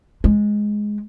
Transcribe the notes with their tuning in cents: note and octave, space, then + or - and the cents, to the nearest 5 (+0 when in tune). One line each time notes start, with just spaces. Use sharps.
G#3 +5